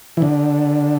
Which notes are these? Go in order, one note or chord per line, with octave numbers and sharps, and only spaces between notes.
E3
D3